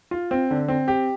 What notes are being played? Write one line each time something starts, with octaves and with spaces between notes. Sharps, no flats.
F4
C4
D3
C4
G4